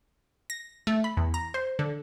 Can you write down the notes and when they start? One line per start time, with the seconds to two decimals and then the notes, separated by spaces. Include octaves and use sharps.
0.50 A#6
0.87 A3
1.04 B5
1.17 E2
1.34 A#5
1.54 C5
1.79 D3